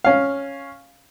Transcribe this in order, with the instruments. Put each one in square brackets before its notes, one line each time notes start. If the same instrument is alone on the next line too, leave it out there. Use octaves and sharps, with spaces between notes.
[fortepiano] C#4 F5